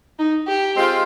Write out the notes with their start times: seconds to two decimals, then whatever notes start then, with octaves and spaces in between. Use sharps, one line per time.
0.19 D#4
0.48 G4
0.76 G#3 C4 F4 C5